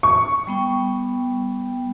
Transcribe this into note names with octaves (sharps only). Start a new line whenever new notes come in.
C#6
G3 B3 G5